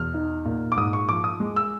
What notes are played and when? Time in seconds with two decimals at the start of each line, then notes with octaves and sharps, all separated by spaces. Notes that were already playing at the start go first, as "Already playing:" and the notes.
Already playing: E2 B2 F6
0.14 D#4
0.45 A#2
0.72 D6
0.77 G#2 D#6
0.93 C#6
1.09 F3 D6
1.24 D#6
1.40 G#3
1.56 E6